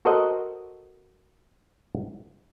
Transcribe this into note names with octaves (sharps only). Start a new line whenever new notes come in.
F#4 A4 A#4 C5 D#5 F#5